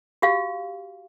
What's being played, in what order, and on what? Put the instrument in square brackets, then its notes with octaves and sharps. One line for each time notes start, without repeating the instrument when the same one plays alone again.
[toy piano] F#4 G4 F5